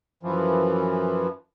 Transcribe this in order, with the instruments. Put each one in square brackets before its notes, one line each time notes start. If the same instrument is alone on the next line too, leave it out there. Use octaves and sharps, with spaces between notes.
[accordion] F#2 E3 F3